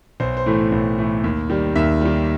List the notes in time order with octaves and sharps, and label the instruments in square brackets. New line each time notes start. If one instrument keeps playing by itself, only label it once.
[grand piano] B1 C5
C5
A2 E3 A3
B1
A2 E3 A3
D#2
D#3 G3
D#2 E5
D#3 G3